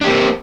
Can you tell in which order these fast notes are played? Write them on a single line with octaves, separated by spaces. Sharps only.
D4 G4 A#3 C4